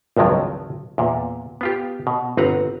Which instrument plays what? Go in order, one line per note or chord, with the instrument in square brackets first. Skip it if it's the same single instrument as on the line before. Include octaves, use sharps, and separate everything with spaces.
[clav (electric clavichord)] G#1 C#2 G2 F3 F#3
E2 A#2
B3 F4 G4
B2
G1 C4 B4 F#5 A#5